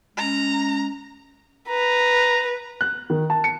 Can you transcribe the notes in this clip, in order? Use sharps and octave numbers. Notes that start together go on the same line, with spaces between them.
G#3 C#4 A#5
B4 A#5
F#6
D#3
A5
C#7